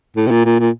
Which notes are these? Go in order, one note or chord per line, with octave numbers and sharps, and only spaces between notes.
A2
C3
A#2
A#2
A#2